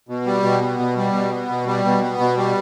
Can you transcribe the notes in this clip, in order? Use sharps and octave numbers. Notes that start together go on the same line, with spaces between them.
B2
G3
B2
B3
B2
G3
B2
B3
B2
G3
B2
B3
B2
G3